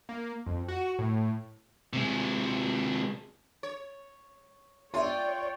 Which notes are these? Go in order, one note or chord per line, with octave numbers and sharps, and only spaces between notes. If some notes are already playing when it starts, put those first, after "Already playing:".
A#3
F2
F#4
A2
C3 G#3
C#5
F4 C#5 D5 E5 G5 C6